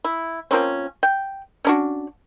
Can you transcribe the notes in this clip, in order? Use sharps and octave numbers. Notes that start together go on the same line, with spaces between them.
E4
F3 A#3 C4 C#4
G5
C#4 D4 F#4